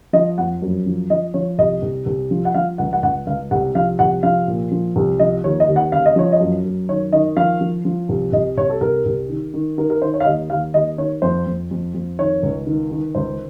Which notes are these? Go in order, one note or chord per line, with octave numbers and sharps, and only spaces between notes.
F3 D#5
F2 F#5
F#2
F3
F3 D#5
F3 C#5
C2 D#5
C2
C2
F3
F#5
F3 F5
C#2 F#5
F#5
C#2 F#5
C#2 F5
C2 F#5
F3 F5
C2 F#5
F3 F5
A#2
F3
C2
F3 D#5
D#2 C#5
D#5
D#2
F#5
C#3 F5
D#5
F3 C#5
D#5
F#2
F#2
D#3 C#5
D#3 D#5
F3 F5
F3
F3
C2
C2 D#5
C2 C#5
A4
C2 A#4
C2
D#3
D#3
D#3 A#4
A#4
D#3 C5
C#5
F5
D#2 D#5
D#2 F5
D#2 D#5
D#3 C#5
F2 C5
F2
F2
F2
D#3 C#5
C#2
D#3
D#3
C#2 C5